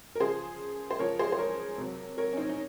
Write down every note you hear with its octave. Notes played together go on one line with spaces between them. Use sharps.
A#4
C#3 F3 G#4 C5
C5
C#3 F3 A#4 C#5
G#4 C5
C5
A#4 C#5
C3 F#3
A#4 C#5
C#4
C4 D#4
D#4